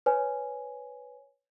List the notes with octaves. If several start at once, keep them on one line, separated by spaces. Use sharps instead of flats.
B4 C#5 G#5